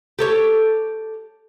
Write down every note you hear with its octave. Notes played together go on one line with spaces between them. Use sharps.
G4 A4 C#5